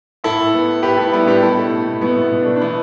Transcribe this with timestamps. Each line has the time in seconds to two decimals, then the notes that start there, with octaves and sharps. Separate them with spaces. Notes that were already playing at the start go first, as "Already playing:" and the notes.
0.24 A2 E4 A4
0.38 A2
0.54 B3
0.68 B3
0.83 A2 G4 B4
0.97 B3 E4 A4
1.13 G3 B3 E4
1.27 A2 D4 G4
1.42 B2 E4 A4
1.58 A3
1.72 A3
1.87 B2
2.01 B2 B3 E4
2.16 B2
2.21 B3
2.31 B2
2.41 D4
2.46 A3
2.56 D4
2.61 E3 B3 E4